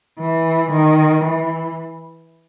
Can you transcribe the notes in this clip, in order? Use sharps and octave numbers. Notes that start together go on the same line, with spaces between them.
E3
D#3
E3